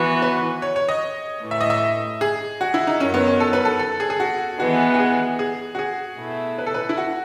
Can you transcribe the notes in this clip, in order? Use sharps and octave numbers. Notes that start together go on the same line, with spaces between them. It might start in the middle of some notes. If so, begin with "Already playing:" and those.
Already playing: E3 B3 F#4
B4
C#5
C#5
D#5
A2 E3 A3
E5
D#5
E5
G#4
F#4
E4
D#4
F#2 D#3 F#3 C#4
B3
C#4
A4
B4
A4
A4
G#4
G#4
F#4
E3 G#3 B3 F#4
F#4
G#4
G#4
F#4
G#4
B2 A3 E4
B4
A4
B4
E4
F#4